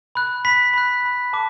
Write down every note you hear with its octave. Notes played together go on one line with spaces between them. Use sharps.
B5 F#6
B5 F#6 B6
B5 F#6
B5 F#6
A5 D6